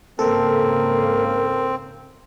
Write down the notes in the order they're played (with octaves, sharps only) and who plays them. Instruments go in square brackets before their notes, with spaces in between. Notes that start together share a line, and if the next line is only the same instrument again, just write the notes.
[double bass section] G#2 C#3 A#3 [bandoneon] C4 [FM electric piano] A4 [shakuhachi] A#4